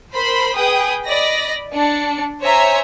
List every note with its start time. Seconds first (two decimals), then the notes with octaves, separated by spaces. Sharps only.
0.14 A#4 C5 B5 C6
0.57 G#4 B4 G5 D#6
1.05 D5 D#5 B5 A#6
1.73 D4 C#7
2.42 C5 C#5 E5 G#5 A#5